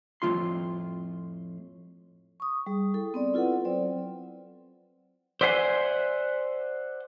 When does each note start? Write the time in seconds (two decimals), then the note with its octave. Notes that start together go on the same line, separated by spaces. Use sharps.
0.22 F2 A2 D#3 F4 C6
2.40 C#6 D#6
2.66 G3 G#4
2.94 E4 A4
3.14 B3 C4 D5
3.34 E4 F4 A4 B4 F#5
3.65 F#3 C4 C5 D5 G5
5.41 C5 D5 E5 F#5 G#5 C6